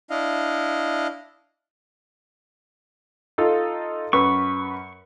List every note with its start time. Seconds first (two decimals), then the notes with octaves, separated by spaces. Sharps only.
0.10 D4 E4 D#5 F5
3.38 D#4 F4 A4
4.13 F#2 B4 C#6